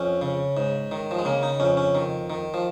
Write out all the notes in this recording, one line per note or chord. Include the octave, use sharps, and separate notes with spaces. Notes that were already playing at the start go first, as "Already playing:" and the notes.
Already playing: F2 C#4
C#3
G#2
D#3
F3
G#3
C#3 A#3
D#4
F2 C#4
C#4
D#3
D#3
F3